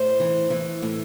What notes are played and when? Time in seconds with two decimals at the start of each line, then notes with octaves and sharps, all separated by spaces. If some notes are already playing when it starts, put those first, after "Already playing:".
Already playing: A2 C5
0.20 E3
0.50 E3
0.82 A2